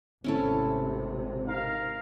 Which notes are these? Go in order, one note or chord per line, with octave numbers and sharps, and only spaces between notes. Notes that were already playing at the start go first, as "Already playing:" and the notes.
G#1 C3 A3 C4 C#4 E4 A4
D#4 A#4 F5